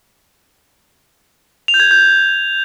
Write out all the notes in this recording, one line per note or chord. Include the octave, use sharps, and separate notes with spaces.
F7
G6
G#6
F7
G6